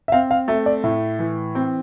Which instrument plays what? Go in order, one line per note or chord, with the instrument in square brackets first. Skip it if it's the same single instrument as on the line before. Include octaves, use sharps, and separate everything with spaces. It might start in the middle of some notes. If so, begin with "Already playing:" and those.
[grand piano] E5
[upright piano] C4 [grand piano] F5
[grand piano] F5
[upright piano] A3 [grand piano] E5
[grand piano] D5
[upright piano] A2 [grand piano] E5
[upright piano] E3
C4